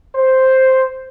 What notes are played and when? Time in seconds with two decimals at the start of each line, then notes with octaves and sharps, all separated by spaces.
0.16 C5